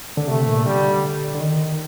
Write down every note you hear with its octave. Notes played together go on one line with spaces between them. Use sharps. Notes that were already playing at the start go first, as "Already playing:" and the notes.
D3
C3 A3
A#2
D3 G3
D3
D#3